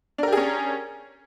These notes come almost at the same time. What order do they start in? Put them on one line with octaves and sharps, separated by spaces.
D4 A#4 G4 G#4 C#4